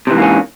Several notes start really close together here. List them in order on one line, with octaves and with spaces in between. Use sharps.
C3 E3 G#2 A#3 C#4